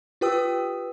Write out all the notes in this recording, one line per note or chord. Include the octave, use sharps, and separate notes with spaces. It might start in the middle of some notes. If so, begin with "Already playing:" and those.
F4 G4 B4 G5 D#6 E6